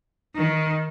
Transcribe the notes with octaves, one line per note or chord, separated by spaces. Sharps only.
D#3